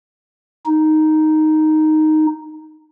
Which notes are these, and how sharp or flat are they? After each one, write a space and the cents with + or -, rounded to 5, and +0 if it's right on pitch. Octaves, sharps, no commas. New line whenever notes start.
D#4 +0